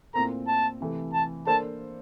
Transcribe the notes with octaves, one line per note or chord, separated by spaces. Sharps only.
A#2 A3 C4 E4 A#4 A#5
A5
C3 E3 A3
A5
A#3 D4 A4 C5 A5